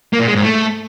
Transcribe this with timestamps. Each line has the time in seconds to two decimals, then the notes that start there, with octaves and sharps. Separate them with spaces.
0.13 A#3
0.20 A#2
0.28 G#3
0.35 G#2
0.42 A3